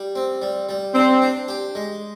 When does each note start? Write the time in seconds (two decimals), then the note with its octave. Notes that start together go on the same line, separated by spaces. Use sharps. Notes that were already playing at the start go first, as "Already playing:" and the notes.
Already playing: G3
0.15 C4
0.42 G3
0.69 G3
0.95 C4 D4
1.22 D4
1.48 G4
1.75 G#3